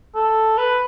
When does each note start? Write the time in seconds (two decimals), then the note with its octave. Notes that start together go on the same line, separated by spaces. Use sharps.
0.15 A4
0.57 B4